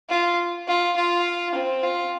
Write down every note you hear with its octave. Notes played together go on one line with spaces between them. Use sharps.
F4
F4
F4
C4
F4